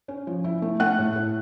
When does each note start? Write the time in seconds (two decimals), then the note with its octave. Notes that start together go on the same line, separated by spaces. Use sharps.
0.08 C#4
0.27 F3
0.44 E4
0.62 A3
0.80 A3 F#5 F#6
0.98 A2
1.16 A2